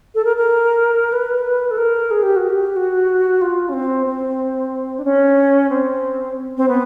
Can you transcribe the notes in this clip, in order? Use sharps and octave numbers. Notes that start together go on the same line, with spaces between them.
A4
A#4
A#4
B4
A4
A#4
G#4
G4
F#4
G4
F#4
F4
C#4
C4
C4
D4
C#4
C4
C4
B3